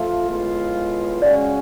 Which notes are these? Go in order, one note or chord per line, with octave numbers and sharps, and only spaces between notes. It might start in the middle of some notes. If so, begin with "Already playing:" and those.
Already playing: F3 A3 F4
A2 G#3 B3 F4
C#3 G#3 C#4 F#4 D5